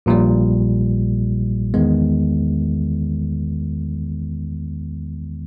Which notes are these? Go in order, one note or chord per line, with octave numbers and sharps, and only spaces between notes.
A#1 A#2 G3
E2 D#3 G#3 B3